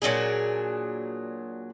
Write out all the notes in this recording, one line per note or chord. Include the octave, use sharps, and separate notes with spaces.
A#2 F#3 D4 G#4